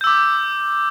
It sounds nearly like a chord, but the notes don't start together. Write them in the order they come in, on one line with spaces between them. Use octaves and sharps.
G6 E6 D6